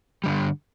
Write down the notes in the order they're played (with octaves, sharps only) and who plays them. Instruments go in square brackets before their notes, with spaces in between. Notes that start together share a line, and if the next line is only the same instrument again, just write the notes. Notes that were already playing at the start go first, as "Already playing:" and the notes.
[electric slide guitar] G2 D3 G3